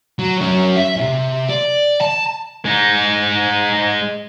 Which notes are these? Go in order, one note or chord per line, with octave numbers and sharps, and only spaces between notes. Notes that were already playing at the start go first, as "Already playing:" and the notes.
F#3
F#3 C#4
E5
B1 C3
D5
A5
G#3 D#4